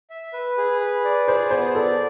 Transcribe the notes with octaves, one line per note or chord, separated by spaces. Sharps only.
E5
B4
G#4
B4
D5
G#4 C5
B3 C5
A4 D5